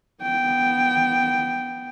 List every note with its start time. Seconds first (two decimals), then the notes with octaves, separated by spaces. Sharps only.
0.23 B3 G5